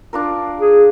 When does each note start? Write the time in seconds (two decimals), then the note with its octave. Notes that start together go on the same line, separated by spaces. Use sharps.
0.13 D4 F4 A#4
0.59 G#4